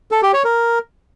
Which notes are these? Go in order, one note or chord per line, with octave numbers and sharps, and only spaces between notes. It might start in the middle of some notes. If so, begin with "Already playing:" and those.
A4
G4
C#5
A#4